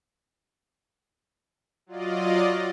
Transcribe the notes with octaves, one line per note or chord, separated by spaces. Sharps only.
F#3 F4 D5 D#5